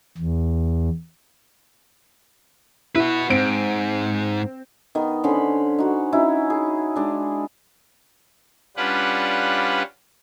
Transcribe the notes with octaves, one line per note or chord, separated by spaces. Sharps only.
E2
E4 F#4 B4
G#2 C4 D7
D#3 B3 D#5
D3 C#4 C5 B5
D#4 F#4
C#4 D#4 E4 F#4
G#4
G#3 D4
G3 C#4 D4 F4 B4 F#5